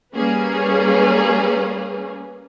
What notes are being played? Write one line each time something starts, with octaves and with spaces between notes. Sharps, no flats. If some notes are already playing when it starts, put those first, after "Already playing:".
G3 A#3 C#4 G#4 B4